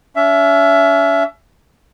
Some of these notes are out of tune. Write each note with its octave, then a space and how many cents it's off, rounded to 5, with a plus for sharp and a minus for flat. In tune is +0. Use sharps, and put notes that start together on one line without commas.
C#4 +45 E5 +20